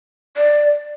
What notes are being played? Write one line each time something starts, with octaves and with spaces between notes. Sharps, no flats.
D5